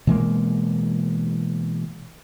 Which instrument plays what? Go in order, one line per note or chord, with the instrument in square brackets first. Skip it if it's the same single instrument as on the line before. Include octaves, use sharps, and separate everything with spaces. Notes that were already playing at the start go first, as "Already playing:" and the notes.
[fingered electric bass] B2 E3 G#3 A#3